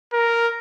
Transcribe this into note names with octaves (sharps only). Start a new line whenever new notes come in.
A#4